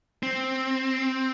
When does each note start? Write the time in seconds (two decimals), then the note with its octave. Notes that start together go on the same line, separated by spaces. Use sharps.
0.23 C4